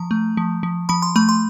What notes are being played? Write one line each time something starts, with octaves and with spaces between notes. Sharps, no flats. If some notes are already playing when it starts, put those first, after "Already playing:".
Already playing: F3 A#5
A3
F3
F3
F3 B5
C6
A3 B5
C6